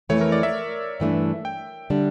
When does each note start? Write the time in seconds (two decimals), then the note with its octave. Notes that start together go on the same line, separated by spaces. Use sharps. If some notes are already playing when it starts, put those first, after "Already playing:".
0.09 F2 E3 A3 C#5
0.21 A#4
0.32 D5
0.43 E5
1.00 G2 E3 A3 D4
1.45 G5
1.90 D3 G3 D4